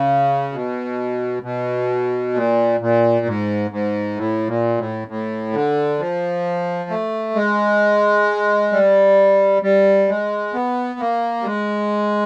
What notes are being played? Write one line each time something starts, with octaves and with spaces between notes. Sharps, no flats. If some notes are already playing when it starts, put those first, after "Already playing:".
Already playing: C#3
B2
B2
A#2
A#2
G#2
G#2
A2
A#2
A2
A2
D3
F3
A3
G#3
G3
G3
G#3
B3
A#3
G3
G#3